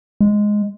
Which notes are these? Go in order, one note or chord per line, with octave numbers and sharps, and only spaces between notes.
G#3